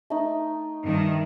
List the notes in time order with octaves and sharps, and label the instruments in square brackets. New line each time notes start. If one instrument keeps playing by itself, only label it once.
[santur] A3 D#4
[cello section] G2 D#3